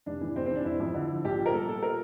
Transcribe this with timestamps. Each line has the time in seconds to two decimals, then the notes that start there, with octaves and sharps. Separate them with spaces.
0.06 F1 D4
0.21 E3
0.35 F1 C4
0.46 C4
0.51 E3
0.56 D4
0.65 F1 E4
0.80 F2
0.95 D3
1.10 F3
1.25 A#1 G4
1.39 A#2
1.46 A#4
1.53 G3 A4
1.68 A#2 A4
1.83 A#4